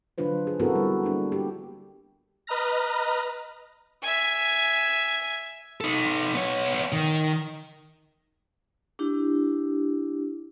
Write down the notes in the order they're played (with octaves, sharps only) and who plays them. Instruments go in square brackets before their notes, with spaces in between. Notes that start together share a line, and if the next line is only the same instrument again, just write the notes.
[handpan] D3 F#3 D4 F4 B4 C5
G#4
B3 C4 E4 F#4 A4 A#4
G3
A#3 B3 D4
G4
[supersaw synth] B4 D#5 A#5 F6 A#6
[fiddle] E5 G#5
[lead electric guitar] D#4 A4
B3 C#5
D#3
[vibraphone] D4 E4 G4